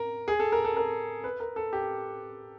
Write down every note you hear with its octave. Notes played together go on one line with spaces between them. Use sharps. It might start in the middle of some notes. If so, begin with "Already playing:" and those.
Already playing: A#4
G#4
A4
A#4
A4
A#4
B4
A#4
A4
G4